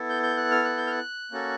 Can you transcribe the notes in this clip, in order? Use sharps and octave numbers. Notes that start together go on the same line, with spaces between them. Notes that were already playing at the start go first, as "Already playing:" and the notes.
Already playing: B3 E4 A4
G6
G6
F#6
F6
F#6
G6
F6
F#6
A#3 C#4 F#4 A4